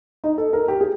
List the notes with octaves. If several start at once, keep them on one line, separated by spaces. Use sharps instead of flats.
D#4
A4
A#4
G4
G#4